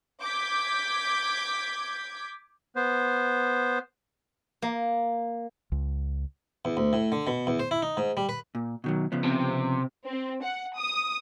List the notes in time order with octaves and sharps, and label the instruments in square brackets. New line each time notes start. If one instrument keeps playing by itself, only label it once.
[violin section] D6 G6 G#6 B6
[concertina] B3 C5
[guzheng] A#3
[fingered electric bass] C#2
[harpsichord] E2
D2
A2
D3
B2
E2
C5
E4
D#4
G#2
G3
B4
[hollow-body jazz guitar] A#2
B2 D#3 F#3
C#3 F3 B3
[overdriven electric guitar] C3
[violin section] C4
F#5
D#6